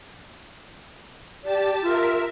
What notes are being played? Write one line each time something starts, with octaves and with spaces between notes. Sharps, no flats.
G4 D5 A5
F4 A#4 E5